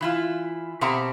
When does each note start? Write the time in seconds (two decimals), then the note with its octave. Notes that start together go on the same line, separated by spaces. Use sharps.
0.01 E3 E4 F4
0.81 B2 C4 G4 E5 F#5 A#5